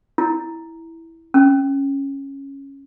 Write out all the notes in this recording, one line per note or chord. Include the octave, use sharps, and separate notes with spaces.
E4
C#4